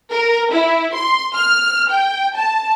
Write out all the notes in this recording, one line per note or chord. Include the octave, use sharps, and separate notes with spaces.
A#4
E4
C6
F6
G5
A5